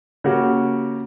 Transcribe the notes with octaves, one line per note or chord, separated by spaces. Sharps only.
C#3 A#3 F#4 G4